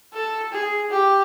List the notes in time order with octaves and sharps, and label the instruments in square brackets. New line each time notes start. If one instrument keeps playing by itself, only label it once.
[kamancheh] A4
G#4
G4